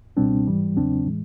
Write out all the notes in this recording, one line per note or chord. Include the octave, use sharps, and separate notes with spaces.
C#2 B2 G3 C4 D4
G#2 E3 G3
E2 C#3 F#3 C4 D4
A2 E3 G#3